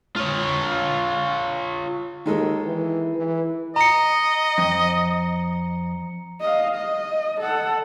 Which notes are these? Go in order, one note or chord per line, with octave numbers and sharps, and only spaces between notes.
F4 C#5
D#2 D#3 G#3 A4
E3
E3
D#5 A#5 C#7
F2
D#5 F5
D#5
A4 F#5